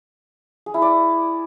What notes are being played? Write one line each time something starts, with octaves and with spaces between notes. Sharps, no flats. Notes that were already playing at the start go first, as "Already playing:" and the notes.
G#4
E4
D5